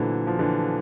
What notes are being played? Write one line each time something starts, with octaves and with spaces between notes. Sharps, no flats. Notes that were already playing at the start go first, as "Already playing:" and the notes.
Already playing: A#2 D3 E3 F#3 A3 C4 E4
F3
D3 E3